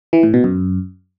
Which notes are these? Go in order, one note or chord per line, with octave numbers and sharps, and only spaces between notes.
E3
A2
B2
F#2